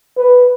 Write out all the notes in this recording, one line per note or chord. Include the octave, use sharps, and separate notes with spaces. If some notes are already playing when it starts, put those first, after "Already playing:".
B4